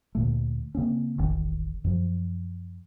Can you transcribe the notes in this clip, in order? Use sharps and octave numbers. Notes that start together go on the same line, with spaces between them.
D2 A#2 A3
C#3 A#3 C4 C#4
E1 A1 D#3
F#2 F3